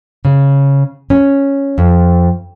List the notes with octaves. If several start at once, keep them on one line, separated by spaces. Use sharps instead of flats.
C#3
C#4
F2